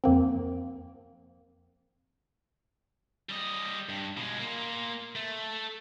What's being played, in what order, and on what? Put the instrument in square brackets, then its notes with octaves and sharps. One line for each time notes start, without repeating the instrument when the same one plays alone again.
[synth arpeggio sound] F2 A#3 C4
[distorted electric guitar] G3 D#5
G2
B2 G#3
A#3 F4
A3